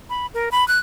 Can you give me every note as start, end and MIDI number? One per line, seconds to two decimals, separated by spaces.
0.10 0.26 83
0.34 0.49 70
0.52 0.67 83
0.68 0.79 90